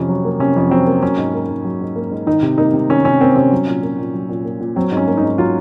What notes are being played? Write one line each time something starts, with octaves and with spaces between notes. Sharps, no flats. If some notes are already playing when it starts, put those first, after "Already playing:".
Already playing: F2 C3 C#4
F#3
A#3
C3 C#4
F2
F#3 C4
A#3
F#3 C#4
G#2
A#3
G#2
F#3
G#2
A#3
G#2
D#3 D#4
C3
A#3 D#4
C3
D#3 C#4
C3 C#4
A#3 C4
C3 C#4
F#3
A#2
A#3
A#2
F#3
A#2
A#3
A#2
F#3 C4
G#2
C#4
A#3
D#4
G#2
F#3 F4